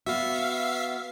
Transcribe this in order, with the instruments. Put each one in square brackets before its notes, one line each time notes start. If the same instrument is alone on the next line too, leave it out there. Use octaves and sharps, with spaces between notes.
[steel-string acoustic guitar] B3 F#4 [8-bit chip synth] E5 F5